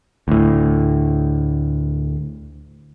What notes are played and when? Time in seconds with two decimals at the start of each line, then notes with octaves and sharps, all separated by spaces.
0.28 D2 A2